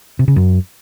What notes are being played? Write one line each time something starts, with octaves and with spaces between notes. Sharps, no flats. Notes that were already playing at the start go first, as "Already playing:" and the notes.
C3
C#3
F#2